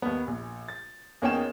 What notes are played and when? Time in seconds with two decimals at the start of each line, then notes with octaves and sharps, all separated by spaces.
0.02 D#2 B3
0.27 A#1
0.68 A6
1.22 E2 A#3 C#4 D#4 G5 E7